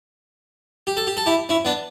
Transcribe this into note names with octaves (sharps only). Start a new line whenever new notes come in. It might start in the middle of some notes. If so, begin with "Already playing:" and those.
G4
A4
G4
A4
E4 G4
C#4 E4
B3 D4